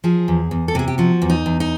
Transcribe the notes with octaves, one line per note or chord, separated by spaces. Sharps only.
F3 G#4
E2
E2
A4
C3 G#4
G4
F3 F#4
E2
D#4
E2
D#4